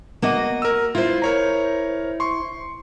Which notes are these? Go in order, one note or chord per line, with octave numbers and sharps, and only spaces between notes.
A#3 F#4 D#5
A#4 E6
E4 F4 C5
A#4 C#5 A#5
C6 C#6